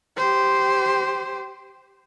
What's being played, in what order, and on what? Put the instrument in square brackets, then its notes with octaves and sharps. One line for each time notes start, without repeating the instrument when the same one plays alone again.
[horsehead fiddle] G4 C5